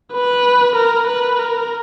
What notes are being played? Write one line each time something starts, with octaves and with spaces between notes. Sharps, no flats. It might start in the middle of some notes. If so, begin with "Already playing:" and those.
B4
A#4
B4
A#4